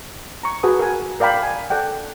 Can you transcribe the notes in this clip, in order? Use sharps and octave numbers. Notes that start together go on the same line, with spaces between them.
A#5 C#6
F#4 G#4 B4 G#5 D#6
A#4 F#5 G#5
A#4 D5 F5 G5 B5
G#5
A4 D5 F#5 G5